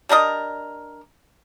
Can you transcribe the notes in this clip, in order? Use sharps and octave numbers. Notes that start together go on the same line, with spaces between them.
G3 D4 A#4 D#5